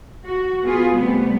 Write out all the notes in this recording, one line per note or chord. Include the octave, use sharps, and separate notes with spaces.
F#4
B3 F4 G#4
C3 G3 A3 B3